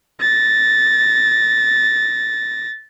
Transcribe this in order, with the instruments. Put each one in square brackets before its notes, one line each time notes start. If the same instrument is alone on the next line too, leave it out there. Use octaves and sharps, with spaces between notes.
[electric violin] A6 A#6